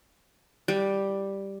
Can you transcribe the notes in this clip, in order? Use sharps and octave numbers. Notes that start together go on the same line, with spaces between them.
G3